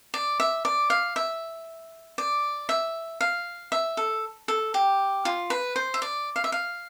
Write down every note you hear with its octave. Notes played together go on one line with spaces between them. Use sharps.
D5
E5
D5
F5
E5
D5
E5
F5
E5
A4
A4
G4
F4
B4
C5
E5
D5
F5
E5
F5